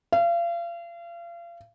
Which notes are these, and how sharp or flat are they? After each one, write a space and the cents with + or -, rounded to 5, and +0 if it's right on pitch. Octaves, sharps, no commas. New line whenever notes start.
F5 -35